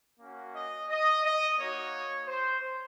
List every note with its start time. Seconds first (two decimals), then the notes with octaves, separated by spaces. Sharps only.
0.20 A#3 C#4 F#4
0.55 D#5
0.90 D#5
1.24 D#5
1.58 A#3 D#4 F#4 C#5
2.28 C5